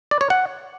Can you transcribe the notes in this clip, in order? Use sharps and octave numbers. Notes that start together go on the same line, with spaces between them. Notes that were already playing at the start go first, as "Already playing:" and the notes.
D5
C#5
F#5